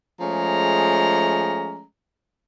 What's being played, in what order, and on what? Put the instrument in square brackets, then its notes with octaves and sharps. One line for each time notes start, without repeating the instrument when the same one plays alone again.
[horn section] F3 G#3 A3 C#4 G#4 A#5